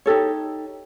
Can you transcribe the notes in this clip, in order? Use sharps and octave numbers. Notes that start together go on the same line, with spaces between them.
D#4 G4 A4 C#5